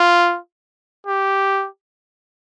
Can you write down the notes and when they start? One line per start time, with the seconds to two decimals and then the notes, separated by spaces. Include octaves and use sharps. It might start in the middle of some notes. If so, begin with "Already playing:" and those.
Already playing: F4
1.07 G4